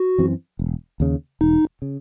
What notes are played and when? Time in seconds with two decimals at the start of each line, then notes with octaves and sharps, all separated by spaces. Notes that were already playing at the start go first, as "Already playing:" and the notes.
Already playing: F#4
0.18 F#2 E3 C4
0.59 E1
1.00 D#2 C#3
1.41 E1 D#4
1.82 C#3